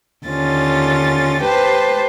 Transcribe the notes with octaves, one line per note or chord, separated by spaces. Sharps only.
D#2 D3 C#4 F4 A6
G4 B4 C5 A5